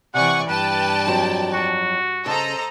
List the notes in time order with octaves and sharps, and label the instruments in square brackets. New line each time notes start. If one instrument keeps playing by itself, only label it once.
[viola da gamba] C3 E3 [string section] D5 G#5 C#6 [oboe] F#5
[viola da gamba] G2 D5 [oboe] B4 [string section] G5 A5
[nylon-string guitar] F2 F#3
[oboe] F#4
[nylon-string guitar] C#3 [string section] A4 D#5 A#5 [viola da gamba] C5